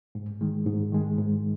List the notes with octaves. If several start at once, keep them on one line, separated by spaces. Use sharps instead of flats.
G#2
D#3 G#3
G#2
D#3 G#3
G#2